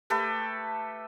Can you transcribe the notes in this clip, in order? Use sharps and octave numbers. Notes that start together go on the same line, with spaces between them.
A3 G4 A4 B4